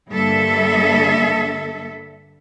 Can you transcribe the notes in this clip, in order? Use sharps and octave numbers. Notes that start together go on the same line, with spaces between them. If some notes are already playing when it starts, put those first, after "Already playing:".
G2 D3 G3 A#3 A4 E5